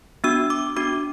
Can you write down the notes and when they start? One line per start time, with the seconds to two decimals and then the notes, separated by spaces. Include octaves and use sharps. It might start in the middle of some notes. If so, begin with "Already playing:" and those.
0.24 B3 D4 F#4 E6
0.50 D6
0.77 B3 D4 F#4 D6